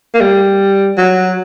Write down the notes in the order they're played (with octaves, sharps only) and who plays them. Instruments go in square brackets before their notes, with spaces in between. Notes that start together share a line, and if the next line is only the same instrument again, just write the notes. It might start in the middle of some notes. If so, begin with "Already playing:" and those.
[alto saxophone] A#3
G3
F#3